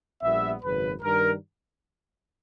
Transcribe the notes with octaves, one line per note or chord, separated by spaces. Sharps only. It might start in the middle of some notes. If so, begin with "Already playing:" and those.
A#1 A#2 G3 B3 E5
G#1 F#2 C#3 B4
G2 D#3 G3 A#4